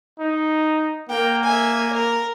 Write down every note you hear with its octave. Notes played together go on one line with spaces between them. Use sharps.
D#4
A#3 A#4 G5
E5 G#5
A#4